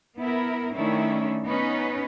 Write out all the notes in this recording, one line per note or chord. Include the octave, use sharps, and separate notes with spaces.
B3 E4 A#4
D#3 A3 C#4 D4 E4
B3 C#4 D#4 B4